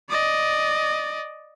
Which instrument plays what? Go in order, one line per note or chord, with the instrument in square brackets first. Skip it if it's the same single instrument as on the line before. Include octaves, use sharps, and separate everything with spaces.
[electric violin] D5 D#5